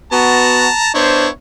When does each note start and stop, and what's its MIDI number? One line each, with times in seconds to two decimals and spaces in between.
0.12 0.68 59
0.12 0.68 66
0.12 0.90 81
0.12 0.90 82
0.95 1.28 59
0.95 1.28 62
0.95 1.28 64
0.95 1.28 72
0.95 1.28 73